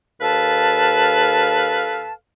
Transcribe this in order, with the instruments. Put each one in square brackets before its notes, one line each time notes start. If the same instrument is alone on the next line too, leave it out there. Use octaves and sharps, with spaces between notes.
[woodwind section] D#2 A4 B4 F5 A5